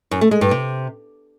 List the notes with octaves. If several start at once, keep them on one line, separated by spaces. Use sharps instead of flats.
F#2
A3
G#3
G2
C3